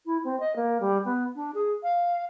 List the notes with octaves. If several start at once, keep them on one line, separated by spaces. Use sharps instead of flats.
E4
C4
D#5
A#3
G3
B3
D4
G#4
F5